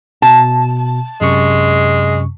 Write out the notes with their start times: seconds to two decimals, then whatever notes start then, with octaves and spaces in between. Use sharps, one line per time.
0.22 B2 A5
1.21 F#2 C3 G#3 C#6